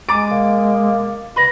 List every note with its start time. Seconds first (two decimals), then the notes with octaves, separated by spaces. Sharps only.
0.09 G#3 G#5 A#5 D6 A6 D7
0.31 B2 A#3
1.36 C#2 B4 D#5 B5